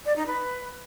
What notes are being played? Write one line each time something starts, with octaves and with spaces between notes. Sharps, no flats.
D5
D#4
B4